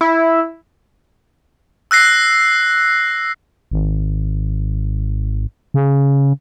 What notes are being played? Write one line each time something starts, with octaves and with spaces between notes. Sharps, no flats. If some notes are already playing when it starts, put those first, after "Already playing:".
E4
E6 F#6 A#6 C7
G#1
C#3